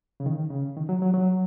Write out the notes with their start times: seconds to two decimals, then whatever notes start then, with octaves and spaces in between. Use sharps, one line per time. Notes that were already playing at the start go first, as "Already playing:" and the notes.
0.20 C#3
0.26 D#3
0.50 C#3
0.77 D#3
0.89 F#3
1.02 F#3
1.14 F#3